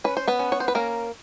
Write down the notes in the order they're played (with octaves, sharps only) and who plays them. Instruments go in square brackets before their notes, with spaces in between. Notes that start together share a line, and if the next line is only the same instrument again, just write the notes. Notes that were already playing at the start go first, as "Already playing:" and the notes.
[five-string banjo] C#4 B4
C5
B3 B4
C#4
C#5
C5
B4
A#3 C#4 A#4